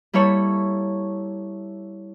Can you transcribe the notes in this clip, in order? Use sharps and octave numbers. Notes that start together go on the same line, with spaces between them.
G3 A#3 E4 A4 C#5